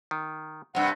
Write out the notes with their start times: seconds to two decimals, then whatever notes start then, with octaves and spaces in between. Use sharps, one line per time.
0.11 D#3
0.75 G2 C3 F#5